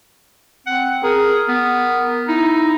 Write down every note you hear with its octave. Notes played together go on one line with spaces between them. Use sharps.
C4 F#5
G#4 A#4
B3
D#4 E4